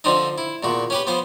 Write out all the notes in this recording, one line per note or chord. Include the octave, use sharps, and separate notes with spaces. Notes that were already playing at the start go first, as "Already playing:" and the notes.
D3 F3 C4 D4 D#4
E4
E2 A#2 F#4
C#4 G4 B4
F3 B3 C5